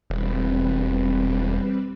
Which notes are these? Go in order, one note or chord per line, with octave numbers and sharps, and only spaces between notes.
E1 G3 C4 B4